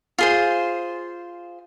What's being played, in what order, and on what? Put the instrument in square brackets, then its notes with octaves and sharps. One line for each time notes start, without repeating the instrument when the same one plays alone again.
[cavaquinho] F4 G#4 C5